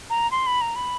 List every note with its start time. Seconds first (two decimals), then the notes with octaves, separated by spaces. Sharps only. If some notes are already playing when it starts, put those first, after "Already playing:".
0.10 A#5
0.31 C6
0.47 B5
0.61 A#5
0.76 B5